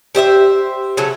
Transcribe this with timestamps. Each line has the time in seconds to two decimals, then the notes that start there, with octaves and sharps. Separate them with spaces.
0.15 G4 C5 D#5 E5
0.97 C#3 F#3 A3